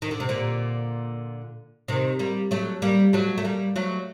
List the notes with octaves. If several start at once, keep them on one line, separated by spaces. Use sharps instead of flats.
D#3
D3
C3
A#2 D3
C3 D#3
G3 A#3
F#3 A3
G3 A#3
F#3 A3
A3
G3 A#3
F#3 A3